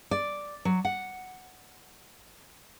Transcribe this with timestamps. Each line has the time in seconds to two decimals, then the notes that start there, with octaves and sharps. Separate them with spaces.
0.11 D5
0.65 F#3
0.85 F#5